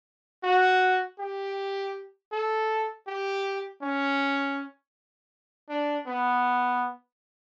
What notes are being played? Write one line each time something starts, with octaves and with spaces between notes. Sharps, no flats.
F#4
G4
A4
G4
C#4
D4
B3